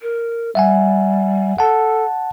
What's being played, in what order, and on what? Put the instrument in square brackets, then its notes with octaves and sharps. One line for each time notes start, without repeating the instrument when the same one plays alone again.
[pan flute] A#4
[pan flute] G3 [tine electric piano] E5 F#5 G#5
[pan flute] A4 [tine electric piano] F#5 A5